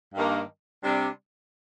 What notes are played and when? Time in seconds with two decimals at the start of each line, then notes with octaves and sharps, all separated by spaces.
0.15 G2 D#3 A#3
0.82 C3 G3 D4